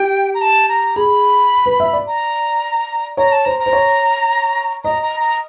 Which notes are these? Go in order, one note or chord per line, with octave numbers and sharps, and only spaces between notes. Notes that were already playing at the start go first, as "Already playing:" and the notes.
Already playing: G4 G5
A#5
A5
A#5
G#4 B5
B4
E5
D5
A#5
C#5 A#5
A5
C5 A#5
A#5
C5
C#5
D#5 A#5
A#5
A#5